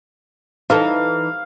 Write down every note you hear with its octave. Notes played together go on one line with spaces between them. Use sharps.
E3 D#4 A4 F5